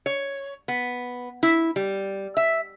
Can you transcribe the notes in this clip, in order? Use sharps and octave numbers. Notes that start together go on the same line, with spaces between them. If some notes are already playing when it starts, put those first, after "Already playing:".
C#5
B3
E4
G3
E5